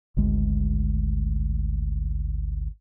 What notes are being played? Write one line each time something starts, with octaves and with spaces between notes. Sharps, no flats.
G#1 D2 G#3